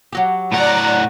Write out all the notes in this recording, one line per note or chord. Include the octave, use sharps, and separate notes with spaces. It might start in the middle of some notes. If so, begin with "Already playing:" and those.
F#3 F#4 G4
A2 D5 F#5 A#5